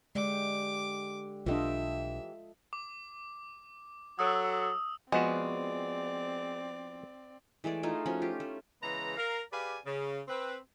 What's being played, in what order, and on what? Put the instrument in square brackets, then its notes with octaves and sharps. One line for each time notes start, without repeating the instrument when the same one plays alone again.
[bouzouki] D3 G4 [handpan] G#3 [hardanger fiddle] D6
[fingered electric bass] B1 D4 [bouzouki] E3 G4 [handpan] F4 A4 D#5 [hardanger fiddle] E5
[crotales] D6
[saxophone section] F#3 A4 [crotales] D#6 E6
[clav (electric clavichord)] F3 B3 F#4 [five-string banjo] G#3 [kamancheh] C4 D5
[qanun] E3 G#3 A3 D5
A3 D#4 F4 G#4
F3 C#4 F#4
F4 G4
A3
[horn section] C#3 E3 G#3 B3 A#5
A#4 F5 A#5
G4 G#4 B4 D5 F5 G#5
C#3
C4 B4